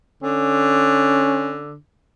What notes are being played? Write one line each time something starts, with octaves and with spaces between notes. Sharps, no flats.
D3 C#4